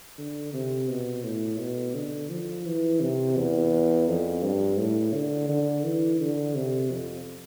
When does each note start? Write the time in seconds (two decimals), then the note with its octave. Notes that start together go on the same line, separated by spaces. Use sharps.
0.18 D3
0.54 C3
0.89 B2
1.24 A2
1.59 B2
1.95 D3
2.30 F3
2.65 E3
3.01 C3
3.37 E2
4.08 F2
4.43 G2
4.78 A2
5.14 D3
5.49 D3
5.84 E3
6.20 D3
6.55 C3
6.91 F2